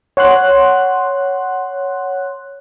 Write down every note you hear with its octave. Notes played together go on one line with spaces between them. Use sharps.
C#5 F#5 C6 F#6